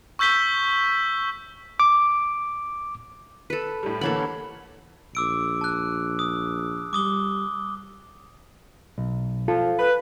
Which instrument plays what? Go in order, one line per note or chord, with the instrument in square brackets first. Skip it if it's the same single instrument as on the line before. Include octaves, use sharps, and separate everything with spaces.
[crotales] C#6 E6 G6 B6 G7
[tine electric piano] D6
[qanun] A4 B4
[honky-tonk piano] A2 G3
[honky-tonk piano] D3 E3 A#3 [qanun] A4 C#5 B5
[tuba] A#1 [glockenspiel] D6 E6 D7
[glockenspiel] A5 F#6
D#6
[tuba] G3 [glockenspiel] D6 D#6 G7
[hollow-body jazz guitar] B1
[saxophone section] F3 [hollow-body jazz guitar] F4 A4
[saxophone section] B4